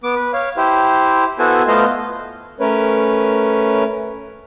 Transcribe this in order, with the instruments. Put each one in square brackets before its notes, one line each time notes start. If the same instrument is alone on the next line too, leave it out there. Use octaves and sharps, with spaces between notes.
[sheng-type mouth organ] B3 D6
B4
C#5 F5
E4 G4 C5
B3 E4 F#4 A4 C5 G#5
A3 B3 F4 C5 D#5 F5
[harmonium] A3 C#4 A#4 B4 C#5